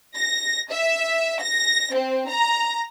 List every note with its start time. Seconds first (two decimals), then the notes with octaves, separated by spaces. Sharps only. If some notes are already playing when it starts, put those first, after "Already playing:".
0.14 A#6
0.71 E5
1.41 A#6
1.93 C4
2.29 A#5